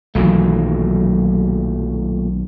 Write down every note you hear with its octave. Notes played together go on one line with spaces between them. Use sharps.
B1 A#2 D#3 E3 F#3 A3